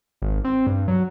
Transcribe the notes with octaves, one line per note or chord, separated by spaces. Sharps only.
G#1
C4
G2
F#3